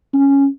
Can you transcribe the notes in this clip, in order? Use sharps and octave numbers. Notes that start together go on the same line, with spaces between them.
C#4